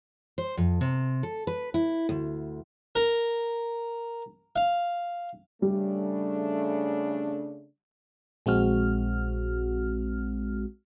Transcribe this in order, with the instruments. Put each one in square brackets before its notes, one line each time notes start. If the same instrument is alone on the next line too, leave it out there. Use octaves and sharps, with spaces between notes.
[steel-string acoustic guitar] C5
F2
C3
A4
B4
E4
D2
[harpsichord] A#4
F5
[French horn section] C#3 A3 D4 [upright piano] G3
[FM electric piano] A#1 G#3 C4 F#4 F6